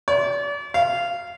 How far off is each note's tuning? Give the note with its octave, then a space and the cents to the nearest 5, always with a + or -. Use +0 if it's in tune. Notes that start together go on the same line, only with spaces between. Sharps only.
D5 -35
F5 -10